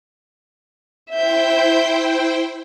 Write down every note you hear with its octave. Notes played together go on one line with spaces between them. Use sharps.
E4 C5 E5 G5 G6